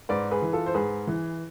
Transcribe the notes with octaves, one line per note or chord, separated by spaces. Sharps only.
G#2 B4 D5
G#4 B4
E3
F4 A4
C5
G#2 G#4 B4
E3